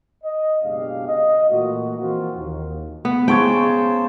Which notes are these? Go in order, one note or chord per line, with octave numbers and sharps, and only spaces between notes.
D#5
F#1 B2 G#3 D4 G4 F5
D#5
A#2 E3 A3 A#3 F4 F#4
E3 F3 A#3 C4 F4 F#4
D#2
B3
C#3 G#3 C5 G5 A5 C#6 G#6